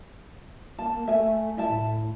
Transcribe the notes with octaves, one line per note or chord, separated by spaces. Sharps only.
A#3 A5
A3 E5 G#5
E4 E5 A5
A2